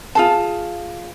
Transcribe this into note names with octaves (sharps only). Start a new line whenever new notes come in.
F4 G#4 A5